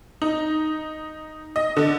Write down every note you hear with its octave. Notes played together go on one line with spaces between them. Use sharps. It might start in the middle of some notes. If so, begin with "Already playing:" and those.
D#4
D#5
D3